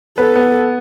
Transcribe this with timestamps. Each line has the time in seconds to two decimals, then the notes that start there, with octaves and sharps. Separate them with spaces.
0.18 B3 A4 B4
0.36 B3 B4